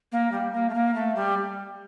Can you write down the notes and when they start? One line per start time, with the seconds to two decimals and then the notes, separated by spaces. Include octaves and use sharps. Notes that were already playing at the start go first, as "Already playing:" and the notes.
0.12 A#3
0.31 G3
0.52 A#3
0.69 A3
0.74 A#3
0.94 A3
1.15 G3